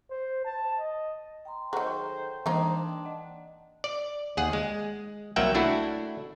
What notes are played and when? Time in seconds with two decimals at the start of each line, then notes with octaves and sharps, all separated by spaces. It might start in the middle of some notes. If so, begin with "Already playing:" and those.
0.10 C5
0.45 A5
0.78 D#5
1.45 G5 A#5 C6
1.73 D#3 F#3 G#4 A4 C5
2.46 E3 A#3 C4 D4 D#4 C5 D#6
3.05 D#5 F#5
3.84 D5
4.37 D#2 G#4 F#5
4.53 G#3
5.36 C2 F#3 A#3 E5 F#5 G5
5.55 A3 D4 E4 F#4